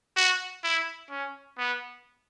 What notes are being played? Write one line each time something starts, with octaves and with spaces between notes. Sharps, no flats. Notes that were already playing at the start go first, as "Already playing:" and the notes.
F#4
E4
C#4
B3